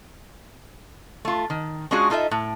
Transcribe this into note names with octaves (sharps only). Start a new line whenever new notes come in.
A3 F4
D#3
G#3 C#4 D4 F4 F#4 G#4
D#4 F4 A4 D#5 E5
A2